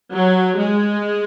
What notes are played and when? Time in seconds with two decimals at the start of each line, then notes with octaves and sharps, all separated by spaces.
0.12 F#3
0.57 G#3